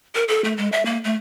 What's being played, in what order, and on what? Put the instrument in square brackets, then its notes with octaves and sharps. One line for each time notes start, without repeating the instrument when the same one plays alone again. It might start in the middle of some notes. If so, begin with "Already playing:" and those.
[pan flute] A#4
A4
A3
G#3
E5
A#3
A3